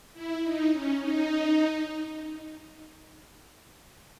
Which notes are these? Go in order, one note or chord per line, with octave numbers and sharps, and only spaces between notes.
E4
D#4
C#4
D#4